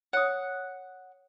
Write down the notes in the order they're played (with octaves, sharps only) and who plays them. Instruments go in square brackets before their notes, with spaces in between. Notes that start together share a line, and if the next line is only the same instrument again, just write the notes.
[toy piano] C#5 D#6 [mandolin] F#5